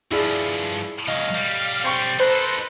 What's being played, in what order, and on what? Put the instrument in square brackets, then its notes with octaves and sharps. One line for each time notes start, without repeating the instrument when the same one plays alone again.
[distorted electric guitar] G2 F3 [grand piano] E4 G#4 D5
[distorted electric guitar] C#2 F#3 [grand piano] D#5 [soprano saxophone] F5
[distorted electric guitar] B1 G3
[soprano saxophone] C4 [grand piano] C#6 A6 C#7
[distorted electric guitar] D#4 A4 [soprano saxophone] B4 [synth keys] C5